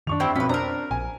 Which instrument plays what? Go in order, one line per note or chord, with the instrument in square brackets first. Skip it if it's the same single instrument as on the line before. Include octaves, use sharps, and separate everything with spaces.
[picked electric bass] F#2 D#3 [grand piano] D4 C#6 F7
[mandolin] C4 E4 G4
[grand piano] B1 F2 B6 [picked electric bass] C4 [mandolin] C#4 B4
[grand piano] D4 C5 [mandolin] A#4 A#5
[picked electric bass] A#1 [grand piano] G#5